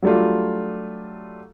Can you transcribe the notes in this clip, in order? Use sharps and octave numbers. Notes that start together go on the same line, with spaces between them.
F#3 G3 A3 D4 F4